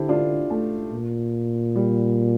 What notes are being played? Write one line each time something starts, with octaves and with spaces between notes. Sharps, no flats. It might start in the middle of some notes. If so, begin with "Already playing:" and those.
Already playing: D3 E4 G4 A4 C5
D4 F4
A3
A#2
G3